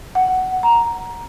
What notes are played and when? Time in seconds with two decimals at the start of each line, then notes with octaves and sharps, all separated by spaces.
0.15 F#5
0.63 A#5